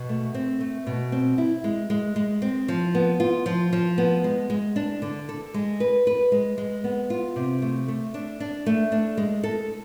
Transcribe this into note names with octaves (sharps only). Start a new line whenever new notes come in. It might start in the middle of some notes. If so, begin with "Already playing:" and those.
Already playing: B2
A3
C4
A3
B2
C4
E4
G#3
G#3
G#3
C4
F3
B3
F4
F3
F3
B3
G#3
G#3
D4
D3
A4
G#3
B4
B4
G#3
G#3
B3
F4
C3
A3
A3
D4
D4
A3
D4
G#3
A4